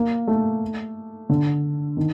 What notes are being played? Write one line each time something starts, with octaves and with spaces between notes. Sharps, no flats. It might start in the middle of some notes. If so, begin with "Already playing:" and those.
Already playing: A#3
A3
D3
D#3